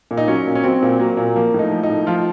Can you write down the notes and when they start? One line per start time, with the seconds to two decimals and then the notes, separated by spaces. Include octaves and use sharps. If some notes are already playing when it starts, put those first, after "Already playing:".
0.11 A#2
0.17 D#4
0.27 F#3 C#4
0.47 A#2
0.55 C#4
0.63 F#3 C4
0.82 A#2
0.99 F#3 A#3
1.17 A#2
1.35 F3 A#3
1.54 A2 D#4
1.71 F3
1.83 D#4
1.89 A2
2.07 F3 F4